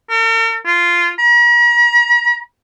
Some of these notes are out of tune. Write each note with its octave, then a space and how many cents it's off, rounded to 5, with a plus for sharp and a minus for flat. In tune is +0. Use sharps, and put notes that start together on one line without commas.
A#4 -45
F4 -10
A#5 +45